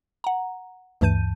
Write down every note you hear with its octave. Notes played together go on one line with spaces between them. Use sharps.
F#5 A#5
D2 G2 E3 A5 G6 D#7